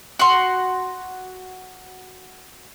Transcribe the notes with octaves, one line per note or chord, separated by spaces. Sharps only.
F#4 F#5 C6